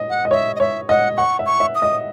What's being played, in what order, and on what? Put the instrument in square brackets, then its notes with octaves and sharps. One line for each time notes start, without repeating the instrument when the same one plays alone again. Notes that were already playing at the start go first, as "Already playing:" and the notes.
Already playing: [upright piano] D#5
[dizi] F#5
[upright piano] D#5
[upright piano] C#5 [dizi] E5
[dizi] D#5
[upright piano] C#5 [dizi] E5
[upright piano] D#5 [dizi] F#5
[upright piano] F#5 [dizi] C#6
[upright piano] E5
[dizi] C#6
[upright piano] E5
[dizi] D#6
[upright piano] D#5